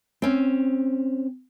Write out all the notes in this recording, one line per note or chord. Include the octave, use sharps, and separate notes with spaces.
C4 C#4